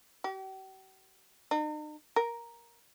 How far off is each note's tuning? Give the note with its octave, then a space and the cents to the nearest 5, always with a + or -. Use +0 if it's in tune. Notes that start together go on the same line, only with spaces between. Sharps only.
G4 -45
D#4 -45
A#4 +5